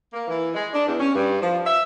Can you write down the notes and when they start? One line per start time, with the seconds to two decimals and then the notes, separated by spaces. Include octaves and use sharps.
0.13 A#3
0.28 E3
0.55 G#3
0.73 D4
0.87 E2
0.99 C#4
1.14 G2
1.41 F3
1.65 E5